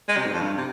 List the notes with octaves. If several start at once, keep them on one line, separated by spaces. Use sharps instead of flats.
G#3
C3
G#2
F2
G2
C3